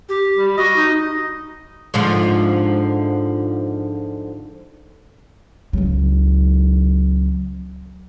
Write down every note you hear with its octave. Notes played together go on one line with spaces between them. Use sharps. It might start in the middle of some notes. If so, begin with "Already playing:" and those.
G4
G3
F#4 D#5
D#4
G#2 D3 F3
C#2 F#3